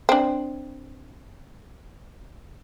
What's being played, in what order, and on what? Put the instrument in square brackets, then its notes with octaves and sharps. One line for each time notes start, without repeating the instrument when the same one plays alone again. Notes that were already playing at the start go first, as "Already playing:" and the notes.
[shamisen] C4 D4